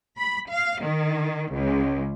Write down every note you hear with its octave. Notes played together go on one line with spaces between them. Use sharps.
B5
F5
D#3
C#2